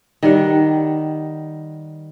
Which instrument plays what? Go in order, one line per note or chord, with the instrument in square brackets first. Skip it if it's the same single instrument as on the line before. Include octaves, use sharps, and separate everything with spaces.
[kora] D#3 G3 F#5